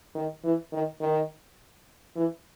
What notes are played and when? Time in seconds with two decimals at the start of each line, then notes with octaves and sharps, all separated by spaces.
0.15 D#3
0.44 E3
0.72 D#3
1.01 D#3
2.16 E3